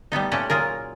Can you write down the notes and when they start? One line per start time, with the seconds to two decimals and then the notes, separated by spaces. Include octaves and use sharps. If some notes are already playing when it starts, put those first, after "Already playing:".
0.12 G3 A3 B3 D#4
0.32 A#2 A3 C#4 G4 F#5
0.50 A#2 F#3 F4 G#4 A#4